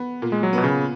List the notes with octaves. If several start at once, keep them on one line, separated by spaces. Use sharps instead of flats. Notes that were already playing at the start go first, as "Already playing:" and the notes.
Already playing: B3
A#2
G#3
F#3
B2 B3
C#3